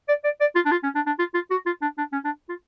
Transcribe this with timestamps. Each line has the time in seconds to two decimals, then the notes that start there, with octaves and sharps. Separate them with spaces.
0.08 D5
0.24 D5
0.41 D5
0.55 F4
0.65 D4
0.71 F4
0.84 C#4
0.95 D4
1.06 D4
1.19 F4
1.34 F4
1.51 F#4
1.66 F4
1.82 D4
1.98 D4
2.13 C#4
2.25 D4
2.49 F4